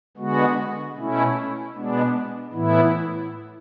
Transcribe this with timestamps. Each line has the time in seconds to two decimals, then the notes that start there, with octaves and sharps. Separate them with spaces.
0.17 D3 G#3 B3 F#4
0.96 B2 A3 C#4 E4
1.74 B2 G#3 B3 D4
2.52 A2 E3 B3 E4